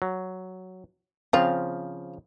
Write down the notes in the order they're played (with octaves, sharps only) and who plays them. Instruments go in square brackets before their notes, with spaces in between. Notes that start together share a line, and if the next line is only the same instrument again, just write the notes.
[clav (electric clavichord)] F#3
[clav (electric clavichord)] C#3 F3 [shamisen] C4 F4